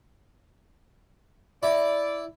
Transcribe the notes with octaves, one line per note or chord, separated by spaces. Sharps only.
E4 D5